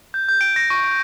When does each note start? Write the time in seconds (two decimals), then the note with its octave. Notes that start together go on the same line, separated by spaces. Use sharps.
0.14 G6
0.29 G6
0.41 D7
0.56 A#6
0.70 C#6
0.84 D7